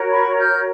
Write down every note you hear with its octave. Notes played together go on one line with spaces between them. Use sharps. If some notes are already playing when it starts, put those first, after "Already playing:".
Already playing: F#4 A#4 C#5
B5 C#6
F6 G6